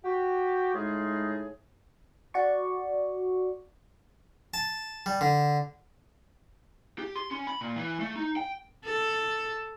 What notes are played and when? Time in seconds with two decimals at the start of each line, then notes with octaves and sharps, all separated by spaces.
0.04 F#4 G4
0.74 A2 G#3 D#4 F4 G#4
2.34 F#4 D5 C#6
4.54 A5
5.06 G3
5.21 D3
6.99 G4
7.16 C6
7.31 C#4
7.47 B5
7.61 A#2
7.76 E3
8.00 A3
8.16 D#4
8.36 G5
8.85 A4